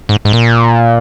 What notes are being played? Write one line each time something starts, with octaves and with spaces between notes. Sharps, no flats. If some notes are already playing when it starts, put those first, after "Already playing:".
G#2
G#2
A#2